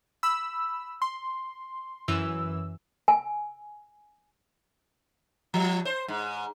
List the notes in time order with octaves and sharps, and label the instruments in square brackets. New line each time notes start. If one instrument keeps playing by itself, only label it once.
[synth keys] B5 E6
C6
F#2 E3 E6
[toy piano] G#5
[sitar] F3
C5
G#2